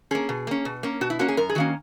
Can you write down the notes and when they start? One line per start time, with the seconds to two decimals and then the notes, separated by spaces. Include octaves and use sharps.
0.11 A#3 C#4 G#4
0.29 B2
0.47 A#3 C#4
0.65 B2
0.83 A#3 C#4
1.01 B2 F#4
1.10 E4
1.19 A#3 C#4 F#4
1.28 G#4
1.37 F#2 A#4
1.49 G#4
1.55 D#3 A#3 C#4 F#4